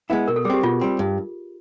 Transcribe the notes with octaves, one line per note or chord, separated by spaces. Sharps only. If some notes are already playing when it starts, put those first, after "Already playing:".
G#3 B3 E4
B2 A#4
A4
G3 C4 G4 G#4
B2 F4
G3 C4
G2